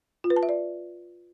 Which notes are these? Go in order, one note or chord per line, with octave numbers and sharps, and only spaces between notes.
F4
B4
A5
E5
D5